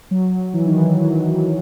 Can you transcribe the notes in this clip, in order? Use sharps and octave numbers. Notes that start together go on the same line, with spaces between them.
F#3
E3
D#3
E3
F#3